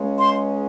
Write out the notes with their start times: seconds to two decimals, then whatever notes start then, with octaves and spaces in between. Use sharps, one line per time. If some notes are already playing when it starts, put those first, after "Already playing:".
Already playing: C#2 C#3 G#3 C#4
0.19 C6